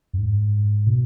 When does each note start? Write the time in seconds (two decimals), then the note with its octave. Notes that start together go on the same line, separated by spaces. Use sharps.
0.13 F#2
0.18 G#2
0.86 B2